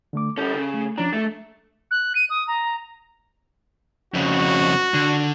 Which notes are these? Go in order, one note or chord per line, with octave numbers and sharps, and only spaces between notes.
D3 A3 D6
G3 C#4 A4 G6
C#3
A3
F3 C#4 D4 A#5
A3 A4 A6
F#6
D#7
D#6
A#5
F2 C#3 F#4
D3